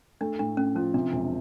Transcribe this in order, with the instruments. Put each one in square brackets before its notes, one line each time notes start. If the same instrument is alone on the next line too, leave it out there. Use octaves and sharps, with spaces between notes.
[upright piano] A3 [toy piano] D4
[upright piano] A2 [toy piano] D4
[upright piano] A2 [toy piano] C#4
[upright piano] F3 [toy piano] C#4
[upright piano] C3 [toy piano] D4
[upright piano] E1 [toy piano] D4